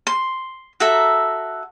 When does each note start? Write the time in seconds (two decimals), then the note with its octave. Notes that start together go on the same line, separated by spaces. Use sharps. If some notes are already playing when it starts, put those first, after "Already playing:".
0.07 C6
0.80 F#4 A4 E5 A#5